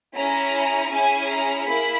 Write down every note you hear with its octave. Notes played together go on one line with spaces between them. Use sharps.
C#4 E4 G#4 A#5
C#4 E4 G#4 G#5
A#5
A#3 E4 G#4 B5